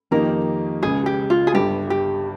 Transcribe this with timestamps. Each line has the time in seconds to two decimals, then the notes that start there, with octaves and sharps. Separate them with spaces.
0.11 F2 D#3 A#3 D#4 G4 A#4
0.83 C#2 C#3 G#3 G#4
1.06 G4
1.30 F4
1.47 G#4
1.54 G1 G2 G3 G4
1.90 G4